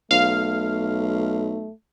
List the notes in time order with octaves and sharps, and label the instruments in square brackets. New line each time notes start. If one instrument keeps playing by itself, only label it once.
[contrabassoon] B1 [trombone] A3 [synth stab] F5